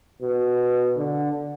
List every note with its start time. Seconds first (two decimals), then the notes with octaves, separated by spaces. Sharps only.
0.21 B2
0.97 D3